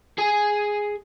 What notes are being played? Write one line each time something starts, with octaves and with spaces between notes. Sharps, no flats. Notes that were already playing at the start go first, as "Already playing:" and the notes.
G#4 G#5